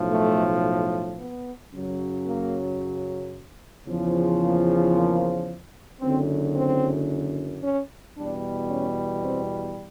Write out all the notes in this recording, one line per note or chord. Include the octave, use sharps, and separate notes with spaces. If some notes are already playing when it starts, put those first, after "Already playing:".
Already playing: B1 A2 F3
A3
B3
F#2 C#3 F#3
A#3
E2 C#3 F3
A#3
A#3
F#1 F#2 D3 C4
C4
C#4
E2 B2 G3 D4
C#4
C4